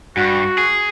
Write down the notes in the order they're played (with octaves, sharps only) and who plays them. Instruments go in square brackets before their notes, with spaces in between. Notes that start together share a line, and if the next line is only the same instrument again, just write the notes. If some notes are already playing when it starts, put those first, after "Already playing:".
[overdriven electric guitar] G2 [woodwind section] F#4
[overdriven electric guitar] G#4